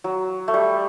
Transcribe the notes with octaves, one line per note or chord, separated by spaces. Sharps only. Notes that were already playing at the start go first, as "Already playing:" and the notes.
F#3
A3
G3